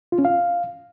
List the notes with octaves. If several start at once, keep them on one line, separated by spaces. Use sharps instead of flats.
F4
C#4
F5